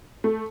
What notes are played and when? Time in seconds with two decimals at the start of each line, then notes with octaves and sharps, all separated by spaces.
0.24 A3